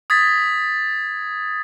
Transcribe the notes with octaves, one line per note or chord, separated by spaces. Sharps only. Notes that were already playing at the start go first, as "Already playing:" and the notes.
D#6 G#6 A6 B6